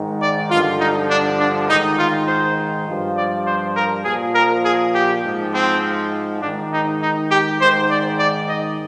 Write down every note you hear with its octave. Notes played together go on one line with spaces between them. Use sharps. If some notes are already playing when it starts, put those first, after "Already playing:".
Already playing: G#2 D#3
D5
G2 D3 F3 F4
D#4
D4
D4
G#2 D#3 D#4
F4
C5
G2 F3
D5
C5
A#4
A#2 F3 G#4
A#4
G#4
G4
G#2 F3
C4
G#2 D#3 D4
D#4
D#4
G4
G#2 D#3 C5
D5
D5
D#5